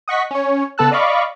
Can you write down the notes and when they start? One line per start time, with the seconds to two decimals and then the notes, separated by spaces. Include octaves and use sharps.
0.08 D#5 F#5 C#6 B6
0.31 C#4 C#5
0.78 C#3 B3 A4 A5 E6 F#6
0.91 D5 D#5 F5 B5 C#6 D6